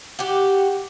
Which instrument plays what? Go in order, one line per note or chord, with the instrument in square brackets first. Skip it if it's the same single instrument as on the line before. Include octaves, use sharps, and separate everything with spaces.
[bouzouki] F#4 G4